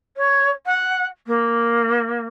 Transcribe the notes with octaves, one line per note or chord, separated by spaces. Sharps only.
C#5
F#5
A#3